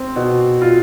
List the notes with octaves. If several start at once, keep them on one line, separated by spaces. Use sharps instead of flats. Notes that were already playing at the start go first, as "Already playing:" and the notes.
Already playing: C4
B2
F4